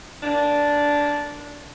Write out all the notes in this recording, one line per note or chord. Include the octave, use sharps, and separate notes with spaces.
D3 A#3 D4